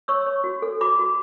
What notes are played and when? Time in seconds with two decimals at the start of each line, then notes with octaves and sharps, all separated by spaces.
0.08 C#5 C#6 E6
0.26 C#5
0.44 F#4
0.62 A4
0.81 F#4 B5 D6
0.99 F#4